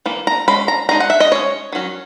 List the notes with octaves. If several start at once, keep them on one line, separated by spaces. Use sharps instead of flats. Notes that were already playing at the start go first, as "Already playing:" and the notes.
E3 A#3
A#5
G#3 C#4 B5
A#5
G#3 D#4 A#5
F#5
E5
D#5
G#3 C#4 C#5
D#3 F#3 C#4